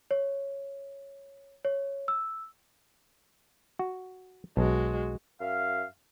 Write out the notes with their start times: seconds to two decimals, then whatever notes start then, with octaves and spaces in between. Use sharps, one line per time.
0.11 C#5
1.65 C#5
2.08 E6
3.79 F#4
4.57 B1 G#3 F#4
5.41 F#2 E5 F5